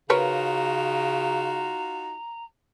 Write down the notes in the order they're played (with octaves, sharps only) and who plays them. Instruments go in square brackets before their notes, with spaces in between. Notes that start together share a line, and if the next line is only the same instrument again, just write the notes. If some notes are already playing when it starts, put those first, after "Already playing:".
[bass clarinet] C#3 [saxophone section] D#4 F4 F#4 [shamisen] A#4 B4 C#5 [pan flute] A#5